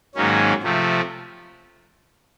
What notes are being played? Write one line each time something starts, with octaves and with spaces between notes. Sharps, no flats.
G#2 D#3 F#3 A#3 C#4
C3 F3 A3